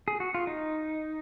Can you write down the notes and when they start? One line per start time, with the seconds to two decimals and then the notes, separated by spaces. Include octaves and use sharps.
0.08 G#4
0.20 F#4
0.34 F4
0.47 D#4